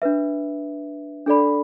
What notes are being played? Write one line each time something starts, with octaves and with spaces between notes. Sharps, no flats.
D4 B4 E5
D4 A4 D5 B5